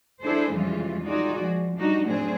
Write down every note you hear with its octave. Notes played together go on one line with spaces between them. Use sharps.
D4 E4 G#4 A4 C5
F2 C#3 E3 G3 G#3 F4
D#4 F4 F#4 G#4 D5
F3 G#3
G3 D4 D#4 F#4
A2 F#3 A3 C4 D4 G#4